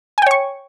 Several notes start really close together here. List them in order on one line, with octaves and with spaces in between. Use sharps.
G#5 G5 C#5 C#6